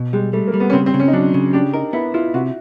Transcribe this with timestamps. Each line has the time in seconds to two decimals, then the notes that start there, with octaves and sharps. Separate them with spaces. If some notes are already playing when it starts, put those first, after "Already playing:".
Already playing: B2
0.13 G3 G#3
0.33 G3 A3
0.47 A#3
0.54 G3
0.60 B3
0.70 C#4
0.73 C#3 C4
0.86 C4
0.94 C#3
1.00 C#4
1.08 D#4
1.13 F#3 D4
1.34 C#3
1.53 D4 G4
1.74 D#4 A#4
1.93 B3 E4
2.14 E4 F4
2.34 C3 F#4